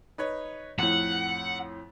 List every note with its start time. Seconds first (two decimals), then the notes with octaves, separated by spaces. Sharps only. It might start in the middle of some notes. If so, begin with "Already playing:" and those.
0.18 D#4 B4 C#5
0.79 F2 A2 F#5